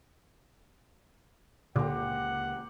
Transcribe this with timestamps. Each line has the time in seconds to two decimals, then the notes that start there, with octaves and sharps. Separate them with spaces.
1.76 C#2 A#2 D3 A#3 G4 C5 F#5 A#5